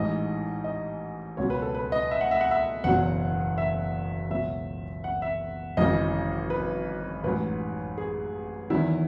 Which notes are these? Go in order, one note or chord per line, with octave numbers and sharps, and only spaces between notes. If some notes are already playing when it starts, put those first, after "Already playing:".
Already playing: A1 G#2 E3 D#5
D#5
C#2 B2 F#3 C#5
B4
A4
B4
D#5
E5
F#5
E5
F#5
E5
F#1 E2 B2 F#3 F#5
E5
C#2 B2 F#3 E5
F#5
E5
G#1 F#2 C#3 E3 D#5
B4
A1 G#2 F#3 B4
G#4
E2 D#3 F#3 E4